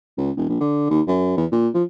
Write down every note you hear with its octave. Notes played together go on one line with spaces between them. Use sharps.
C#2
E1
A#1
D3
D#2
F#2
E2
A#2
F3